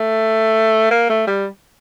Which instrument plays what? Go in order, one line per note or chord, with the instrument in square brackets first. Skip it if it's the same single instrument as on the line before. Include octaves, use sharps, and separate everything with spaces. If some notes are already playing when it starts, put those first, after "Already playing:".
Already playing: [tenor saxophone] A3
A#3
A3
G3